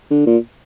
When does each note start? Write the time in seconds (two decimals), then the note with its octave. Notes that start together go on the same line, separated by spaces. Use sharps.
0.11 D3
0.26 A#2